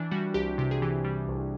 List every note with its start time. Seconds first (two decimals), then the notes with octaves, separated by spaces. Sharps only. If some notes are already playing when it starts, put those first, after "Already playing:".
Already playing: E3 D4
0.11 G3 F#4
0.34 C2 G4
0.58 C3 G4
0.71 G#4
0.82 E3 G4
1.04 G3
1.28 C2